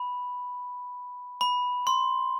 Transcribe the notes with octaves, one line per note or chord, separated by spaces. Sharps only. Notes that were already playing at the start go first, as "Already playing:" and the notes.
Already playing: B5
B5
C6